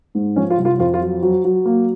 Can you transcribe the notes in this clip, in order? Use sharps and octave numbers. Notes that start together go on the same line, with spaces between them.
G#2
F3 C#4
F4
C2
F4
F2 F4
F4
F#3
F#3
F#3
A#3